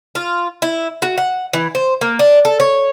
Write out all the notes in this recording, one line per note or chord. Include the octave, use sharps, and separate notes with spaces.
F4
E4
F#4
F#5
E3
C5
A#3
D4
A4
C#5